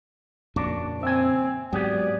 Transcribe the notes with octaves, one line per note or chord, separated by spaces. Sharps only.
F2 A#2 C#3 D4 F#4 D5
C4 E5 G#5
G#2 F#3 B3 G4 G#4 D5